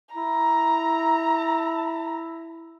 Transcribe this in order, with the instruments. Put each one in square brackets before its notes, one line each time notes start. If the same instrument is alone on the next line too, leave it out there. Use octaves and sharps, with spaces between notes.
[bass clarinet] E4 [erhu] A#5